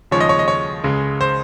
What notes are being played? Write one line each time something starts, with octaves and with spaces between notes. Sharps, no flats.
D#2 C#3 F3 G#3 C#5
D#5
C#5
D#5
C#5
C#2 C#3 G#3
C5